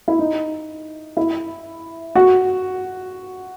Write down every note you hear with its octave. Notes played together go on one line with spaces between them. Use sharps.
E4
D#4
E4
F#4